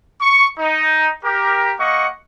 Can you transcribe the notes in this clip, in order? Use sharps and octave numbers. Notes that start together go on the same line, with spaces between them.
C#6
D#4
G4 A#4
A#3 D#5 F#5 C#6